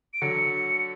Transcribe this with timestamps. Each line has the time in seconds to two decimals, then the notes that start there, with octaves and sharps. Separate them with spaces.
0.14 D7
0.22 D3 F#3 C#7